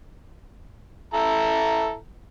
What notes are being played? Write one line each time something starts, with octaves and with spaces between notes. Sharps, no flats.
E4 A4 A#5